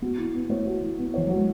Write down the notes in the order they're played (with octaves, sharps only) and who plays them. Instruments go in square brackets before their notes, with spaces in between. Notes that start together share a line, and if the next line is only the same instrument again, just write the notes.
[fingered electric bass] B3 [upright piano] F#4
[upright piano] E3
B3
[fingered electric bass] A3 [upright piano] C#5
[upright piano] F#4
E3
B3
[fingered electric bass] E3 [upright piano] C#5
[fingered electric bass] F#3 [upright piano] F#4
[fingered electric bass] G#3